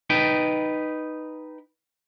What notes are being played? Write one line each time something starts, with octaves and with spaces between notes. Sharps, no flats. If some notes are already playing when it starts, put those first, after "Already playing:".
D#4 B4 G5